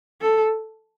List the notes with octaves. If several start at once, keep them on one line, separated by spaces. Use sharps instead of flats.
A4